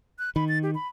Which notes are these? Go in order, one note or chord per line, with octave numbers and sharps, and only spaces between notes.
F#6
D#3 B5
A6
G4
B5